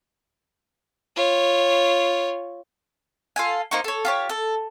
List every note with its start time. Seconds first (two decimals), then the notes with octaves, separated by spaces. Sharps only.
1.16 F4 C#5
3.36 F4 A4 G#5
3.71 A#3 D#4 C5 C#6
3.84 A4 C#5
4.05 F4 G4 C#5
4.29 A4